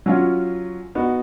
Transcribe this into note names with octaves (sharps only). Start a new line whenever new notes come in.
F#3 C#4 F4
B3 D#4 F#4